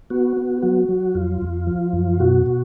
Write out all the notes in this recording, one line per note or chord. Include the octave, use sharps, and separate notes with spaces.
B3 F#4
B3
F#3 F#4
F#3
F2 F4
F2
F3
F#2
B2 F#4
B2